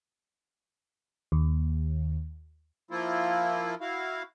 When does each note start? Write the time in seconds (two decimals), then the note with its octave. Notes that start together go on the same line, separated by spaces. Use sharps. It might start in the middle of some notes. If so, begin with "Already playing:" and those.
1.32 D#2
2.91 F3 A#3 E4 F4
3.81 E4 F#4 F5